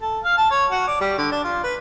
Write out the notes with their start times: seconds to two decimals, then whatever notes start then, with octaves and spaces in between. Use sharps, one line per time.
0.01 A4
0.24 F5
0.37 A5
0.51 C#5
0.70 F#4
0.87 D5
1.01 G3
1.18 D3
1.31 D4
1.44 F4
1.64 B4